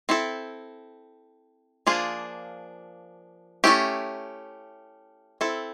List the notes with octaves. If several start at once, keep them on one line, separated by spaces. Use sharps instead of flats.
C4 E4 A4
F3 A#3 D4 F4 G#4
A3 C#4 E4 G4
C4 E4 A4